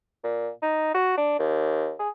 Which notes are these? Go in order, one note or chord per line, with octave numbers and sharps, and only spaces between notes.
A#2
D#4
F#4
D4
D#2
G#4